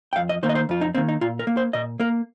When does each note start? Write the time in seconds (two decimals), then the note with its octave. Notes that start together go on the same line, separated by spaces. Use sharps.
0.13 G5
0.16 F2 F5
0.29 D#5
0.43 D#3 A#3 C5
0.49 D#5
0.55 C5
0.69 F2 F4
0.81 D#4
0.95 D#3 A#3 C4
1.08 D#4
1.21 A#2 F4
1.39 A#4
1.47 A#3
1.57 C5
1.73 A#2 D#5
2.00 A#3 A#4